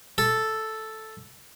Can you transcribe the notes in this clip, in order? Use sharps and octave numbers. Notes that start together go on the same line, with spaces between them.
A4